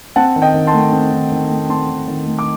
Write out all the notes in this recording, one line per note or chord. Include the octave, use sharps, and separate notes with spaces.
C4 F#5 A5
D#3
D#5 G5
D#3
A5 C6
A3
C4
D#3
D#3
A3
C4 A5 C6
D#3
D#3
A3
D6